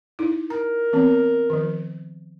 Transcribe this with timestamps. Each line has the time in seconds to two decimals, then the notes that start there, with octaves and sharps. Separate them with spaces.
0.19 D#4 E4
0.50 A#4 A#5
0.93 E3 B3 C4
1.50 D#3 F3